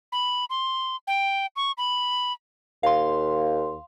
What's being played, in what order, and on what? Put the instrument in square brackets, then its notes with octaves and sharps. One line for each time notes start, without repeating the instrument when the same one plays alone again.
[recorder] B5
C6
G5
C#6
B5
[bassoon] D#2 [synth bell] F5 C6